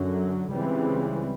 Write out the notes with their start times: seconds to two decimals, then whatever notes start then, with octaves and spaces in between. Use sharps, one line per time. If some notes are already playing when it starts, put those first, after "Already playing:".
Already playing: F#2 D3 F#3
0.51 C#2 C#3 E3 G3 C4